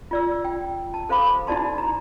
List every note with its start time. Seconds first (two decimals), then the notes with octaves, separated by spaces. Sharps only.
0.11 F4 D5 E6
0.45 G5
0.94 A5
1.09 A4 C5 F5 B5 D6
1.47 D#4 E4 F#4 D5 A5 C6
1.78 A#5